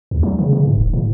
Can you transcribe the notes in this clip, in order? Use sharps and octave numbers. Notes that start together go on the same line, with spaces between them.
D#2
F#3
C#3
C#3
G#2
D#1
A2